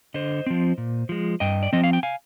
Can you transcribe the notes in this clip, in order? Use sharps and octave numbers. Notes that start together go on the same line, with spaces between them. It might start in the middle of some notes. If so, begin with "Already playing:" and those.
D3 C5 D#5
F3 C4
A#2
F3 G#3
G2 D#5 G5
D5
F3 C4 D#5
F5
G5
F5 G#5